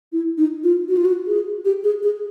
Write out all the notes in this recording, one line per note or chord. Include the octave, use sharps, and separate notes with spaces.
E4
D#4
F4
F#4
F4
F#4
G#4
G4
G#4
G#4